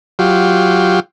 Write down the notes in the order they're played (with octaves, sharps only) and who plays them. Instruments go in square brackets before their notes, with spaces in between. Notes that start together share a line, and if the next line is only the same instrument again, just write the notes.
[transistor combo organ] F#3 F4 G4